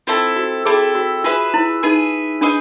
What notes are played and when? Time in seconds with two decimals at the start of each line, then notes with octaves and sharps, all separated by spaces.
0.07 C4 E4 F4 A4
0.36 F#4
0.65 C4 E4 G#4 A4
0.95 F#4
1.24 F4 G#4 B4 E5
1.54 E4
1.83 D#4 G#4 B4 E5
2.41 D4 D#4 G#4 B4